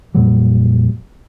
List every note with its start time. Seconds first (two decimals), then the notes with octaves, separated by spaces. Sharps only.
0.15 F2 A#2 F#3 G3